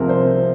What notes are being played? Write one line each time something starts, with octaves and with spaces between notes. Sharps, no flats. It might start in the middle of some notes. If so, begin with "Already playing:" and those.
Already playing: C2 C3 F3 G#4 A#4
C5